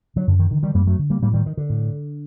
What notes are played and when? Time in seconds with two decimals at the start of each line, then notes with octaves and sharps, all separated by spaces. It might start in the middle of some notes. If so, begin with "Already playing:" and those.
0.16 D3 F#3
0.27 F#2 D3
0.39 D#3
0.51 D3 D#3
0.63 D#3 G3
0.74 F#2 G3 A#3
0.87 F#3 A3
0.99 D3
1.10 G3 A#3
1.22 A2 G3 A#3
1.34 D#3 G3
1.46 D#3
1.57 D3
1.70 A2